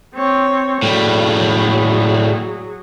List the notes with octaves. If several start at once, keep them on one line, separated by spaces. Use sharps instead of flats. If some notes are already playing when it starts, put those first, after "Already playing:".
C4 C#5
A2 F#3 G3 G#4